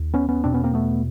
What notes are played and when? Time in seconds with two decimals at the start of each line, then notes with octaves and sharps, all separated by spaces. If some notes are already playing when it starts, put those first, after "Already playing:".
Already playing: D#2
0.14 B3 C#4
0.29 B3 C#4
0.44 E2 B2 C4 D4
0.54 B3 C#4
0.64 A#3 C4
0.74 A3 B3